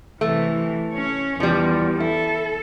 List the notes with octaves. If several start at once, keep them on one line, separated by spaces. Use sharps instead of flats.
C3 E3 A3
C#4 C#5
E2 F3 G3
E4 A4